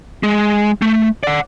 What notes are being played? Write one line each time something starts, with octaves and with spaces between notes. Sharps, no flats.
G#3
A3
D5 F#5